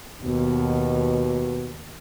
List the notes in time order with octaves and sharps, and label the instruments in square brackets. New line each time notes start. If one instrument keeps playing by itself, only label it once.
[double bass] D#2 [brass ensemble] B2